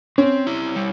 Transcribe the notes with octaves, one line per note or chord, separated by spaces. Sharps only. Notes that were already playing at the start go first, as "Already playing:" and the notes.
C4 C#4
E4
G3